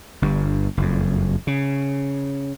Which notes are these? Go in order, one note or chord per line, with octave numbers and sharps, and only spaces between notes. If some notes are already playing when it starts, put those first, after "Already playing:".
G1 G2
F#1 F2
C#3